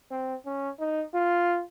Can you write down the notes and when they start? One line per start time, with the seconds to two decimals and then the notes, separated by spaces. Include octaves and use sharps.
0.11 C4
0.46 C#4
0.79 D#4
1.14 F4